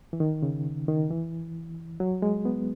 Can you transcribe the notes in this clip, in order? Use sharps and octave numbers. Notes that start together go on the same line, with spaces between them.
E3
D#3
C#3
D#3
E3
F#3
G#3
B3